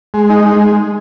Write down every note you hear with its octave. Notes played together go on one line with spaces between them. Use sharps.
G#3
D#4
G#3